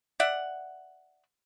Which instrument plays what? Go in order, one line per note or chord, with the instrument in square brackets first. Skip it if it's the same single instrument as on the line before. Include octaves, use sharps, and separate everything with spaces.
[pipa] D5 E5 F#5